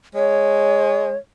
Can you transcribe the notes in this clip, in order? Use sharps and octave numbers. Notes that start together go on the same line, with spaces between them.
G#3 C#5